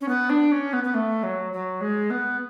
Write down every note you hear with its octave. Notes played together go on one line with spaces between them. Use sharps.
C#4
B3
D4
C#4
B3
B3
A3
F#3
F#3
G#3
B3